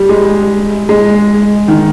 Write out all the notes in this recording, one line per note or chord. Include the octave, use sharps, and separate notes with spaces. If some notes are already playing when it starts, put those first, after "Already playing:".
Already playing: G3
G#3
G#3
D#3